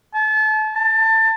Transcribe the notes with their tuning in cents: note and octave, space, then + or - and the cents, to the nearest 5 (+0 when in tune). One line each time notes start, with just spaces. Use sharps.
A5 -30
A5 +25